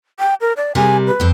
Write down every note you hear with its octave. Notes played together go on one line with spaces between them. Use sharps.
G5
A#4
D5
C3 G3 A#4 G#5
B4
F2 C4